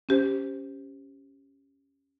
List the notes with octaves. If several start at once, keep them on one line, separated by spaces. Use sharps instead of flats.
C#4 G4 C5